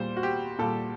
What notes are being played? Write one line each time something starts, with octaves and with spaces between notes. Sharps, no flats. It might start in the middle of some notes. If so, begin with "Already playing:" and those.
Already playing: A#2 G3 C5
F#4
G4
A#2 G3 A4